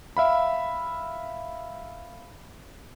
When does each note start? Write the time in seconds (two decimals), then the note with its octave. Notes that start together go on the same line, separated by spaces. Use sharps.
0.17 E5 F5 B5